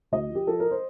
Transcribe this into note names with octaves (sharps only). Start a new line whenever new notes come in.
D2 D#5
F3
G4
F3 A4
A#4
C5